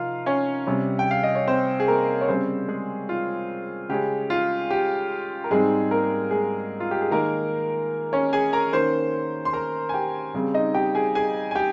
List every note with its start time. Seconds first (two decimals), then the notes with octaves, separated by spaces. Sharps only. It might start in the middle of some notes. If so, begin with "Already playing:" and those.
Already playing: C3 F3 D#4 F4 A#4 F5
0.26 C#4 C#5
0.67 C3 G3 C#4
0.99 G5
1.11 F5
1.23 D#5
1.35 C#5
1.47 C4 C5
1.80 G#4
1.88 A#3 A#4
2.21 C#5
2.28 C#3 G3 C4 C#4 C5
2.68 G#3 G#4
3.09 F4
3.89 C#3 G#3 C#4 G4
4.30 F4
4.71 G4
5.44 A#4
5.51 G#2 G3 G#3 C4 D#4 G#4
5.91 A#3 A#4
6.31 G#3 G#4
6.80 F4
6.91 G4
7.01 G#4
7.11 D#3 G#3 A#3 D#4 A#4
8.13 C#4 C#5
8.33 G#4 G#5
8.53 A#4 A#5
8.73 D#3 A#3 C#4 C5 C6
9.45 C6
9.53 A#4 A#5
9.89 G#5
9.94 G4 G5
10.35 C#3 G3 C4
10.54 D#4 D#5
10.74 G4 G5
10.95 G#4 G#5
11.15 G#4 G#5
11.51 G#5
11.55 G4 G5